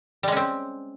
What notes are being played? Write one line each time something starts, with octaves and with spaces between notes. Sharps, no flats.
G3 G#3 C4 C#4